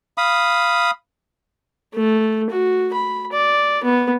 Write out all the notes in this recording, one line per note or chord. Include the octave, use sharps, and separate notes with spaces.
F5 B5 D#6
A3
F#4
B5
D5
B3